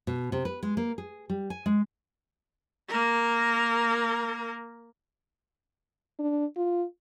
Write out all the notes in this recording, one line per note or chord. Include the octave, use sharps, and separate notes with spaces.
B2
C3
B4
G#3
A#3
G#4
G3
G#5
G#3
A#3 A#4
D4
F4